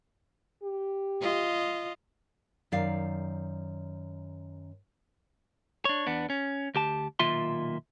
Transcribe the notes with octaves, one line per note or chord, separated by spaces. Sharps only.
G4
F4 D#5
F#2 D#3 D5 F5
D4 C#5
E2 B3 D4
C#4
D2 G4 A5
B1 A#2 D#3 F4 E5 C6